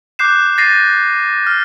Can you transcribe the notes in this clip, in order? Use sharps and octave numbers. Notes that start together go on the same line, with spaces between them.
D6 F#6 G6 C7 E7
A6 A#6 C7 D#7
F6